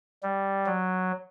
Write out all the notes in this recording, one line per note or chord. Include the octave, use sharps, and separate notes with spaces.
G3
F#3